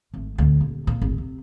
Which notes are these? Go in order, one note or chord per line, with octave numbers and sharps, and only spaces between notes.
G#1 A3
D2 A2
D#1
A#2
D1 G#1
C3